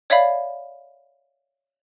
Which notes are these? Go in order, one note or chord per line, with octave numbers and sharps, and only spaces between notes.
C#5 D5 E5 F5 B5